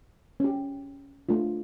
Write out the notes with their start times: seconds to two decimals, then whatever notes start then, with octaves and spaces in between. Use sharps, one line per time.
0.40 C#4 G4
1.29 A3 D4 F4